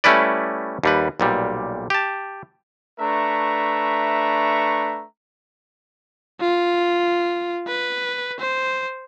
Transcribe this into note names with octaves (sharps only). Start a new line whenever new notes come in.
G3 A3 C#4 E4 B4 D5
D#2 G3 B4
B1 A#2 G3
G4 A5
A3 D4 B4 E5 A#5 C#6
F4
B4
C5